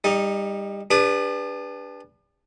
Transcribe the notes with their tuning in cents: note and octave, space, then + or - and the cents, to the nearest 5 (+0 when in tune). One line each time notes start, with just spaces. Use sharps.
G3 +25 D#4 +0
D4 -10 G4 +45 B4 +0